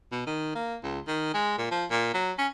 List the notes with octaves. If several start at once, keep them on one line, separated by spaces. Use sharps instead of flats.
B2
D#3
A#3
C#2
D#3
G#3
A#2
F3
A#2
F#3
C#4